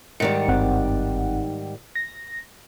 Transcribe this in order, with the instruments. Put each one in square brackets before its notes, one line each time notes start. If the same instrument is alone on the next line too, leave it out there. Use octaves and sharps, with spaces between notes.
[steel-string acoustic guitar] G#2 D#3 G3 [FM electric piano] C#7
[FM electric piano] G1 C4 F#5
A#6